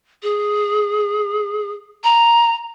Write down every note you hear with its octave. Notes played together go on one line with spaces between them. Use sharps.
G#4
A#5